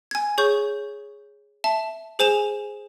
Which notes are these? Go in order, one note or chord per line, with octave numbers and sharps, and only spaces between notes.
G#5 G#6
G#4 C#5 C#6 G6
E5 A5
G#4 C5 G#5 E7 F7